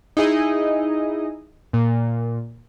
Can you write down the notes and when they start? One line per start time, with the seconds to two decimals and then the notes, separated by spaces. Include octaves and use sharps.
0.17 D#4 E4 G#4 D#5
1.73 A#2